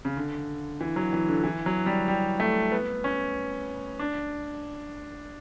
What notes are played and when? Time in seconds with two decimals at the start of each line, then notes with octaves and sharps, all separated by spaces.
0.05 C#3
0.17 D3
0.81 E3
0.96 F#3
1.13 E3
1.29 D3
1.44 E3
1.66 F#3
1.86 G3
2.08 G3
2.40 A3
2.72 B3
3.04 C#4
3.99 D4